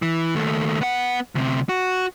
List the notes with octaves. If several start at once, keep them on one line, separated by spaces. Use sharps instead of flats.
E3
D#2 A3
B3 F#5
D2 C3
F#4